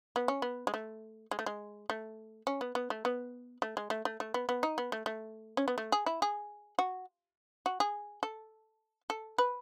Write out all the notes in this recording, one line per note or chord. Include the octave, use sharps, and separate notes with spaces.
B3
C#4
B3
G#3
A3
G#3
A3
G#3
A3
C#4
B3
B3
A3
B3
A3
G#3
A3
A3
A3
B3
B3
D#4
B3
A3
A3
C#4
B3
A3
G#4
E4
G#4
F#4
F#4
G#4
A4
A4
B4